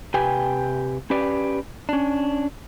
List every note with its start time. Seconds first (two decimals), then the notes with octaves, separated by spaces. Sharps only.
0.14 C3 G4 B4 G5 G#5
1.10 C#4 G4 B4 D5
1.89 C#4 D4